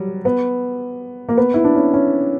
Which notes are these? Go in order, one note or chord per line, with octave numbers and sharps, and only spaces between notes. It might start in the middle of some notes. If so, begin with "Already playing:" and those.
Already playing: F#3 G3
B3
A#3
B3
E4
D4
C#4
C#4